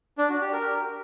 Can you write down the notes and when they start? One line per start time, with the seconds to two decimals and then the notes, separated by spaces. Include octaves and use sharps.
0.18 D4
0.30 F#4
0.41 G4
0.53 A#4